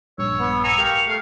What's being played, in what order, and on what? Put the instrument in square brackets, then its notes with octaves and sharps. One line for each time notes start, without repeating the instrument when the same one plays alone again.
[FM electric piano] A#1 G2 [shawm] C#5 [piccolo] E6
[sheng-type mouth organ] B3
[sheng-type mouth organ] G#5 A#5 E6 [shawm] C#6 [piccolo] F7
[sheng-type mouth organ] G4 F5 [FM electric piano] A#4
[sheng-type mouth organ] A3 [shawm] F5